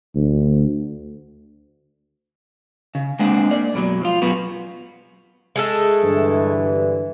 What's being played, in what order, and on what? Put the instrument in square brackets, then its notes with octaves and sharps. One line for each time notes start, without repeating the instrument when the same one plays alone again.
[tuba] D2
[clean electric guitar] C#3
G#3 A#3 C4 D4 F#5
A#3 D5
F#2 B2 F3 F#3
F3 F4
F#2 B2 B3 F#4
[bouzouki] G#3 A3 A4
[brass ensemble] G2 D3 E3